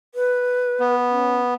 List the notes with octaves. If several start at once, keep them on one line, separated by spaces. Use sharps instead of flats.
B4
B3
C#4